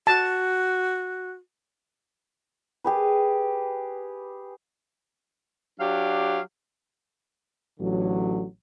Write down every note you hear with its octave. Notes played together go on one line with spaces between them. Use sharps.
F#4 A5
G4 G#4 B4
F#3 D4 G4 F5
A1 D3 F#3